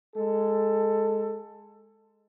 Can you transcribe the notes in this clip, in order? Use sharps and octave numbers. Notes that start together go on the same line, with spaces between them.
G#3 A4